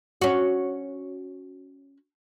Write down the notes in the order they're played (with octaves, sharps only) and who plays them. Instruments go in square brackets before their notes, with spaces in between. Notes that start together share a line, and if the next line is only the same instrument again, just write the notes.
[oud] C#4 F#4